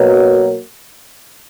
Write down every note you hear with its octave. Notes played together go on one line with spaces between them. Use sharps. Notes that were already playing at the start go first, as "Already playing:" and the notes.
Already playing: B2 F#3 A#3